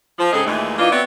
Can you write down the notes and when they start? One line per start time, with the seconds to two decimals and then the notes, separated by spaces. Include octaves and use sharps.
0.19 F3
0.32 G#2 C#3 C4 G#4 A4 D#5
0.46 D#2 A#2 E3 G#3 A3
0.78 E3 A#3 D4 D#4 F4
0.90 B3 C4 F#4 C#5 D5 E5